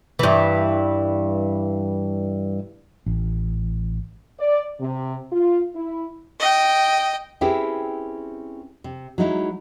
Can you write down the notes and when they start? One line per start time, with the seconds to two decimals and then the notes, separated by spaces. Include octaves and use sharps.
0.19 G2 E3
3.06 A1
4.40 D5
4.80 C3
5.32 F4
5.76 E4
6.40 D#5 G5
7.41 C4 C#4 E4 G4 G#4 B4
8.84 C3
9.18 F#3 G#3 D#4 E4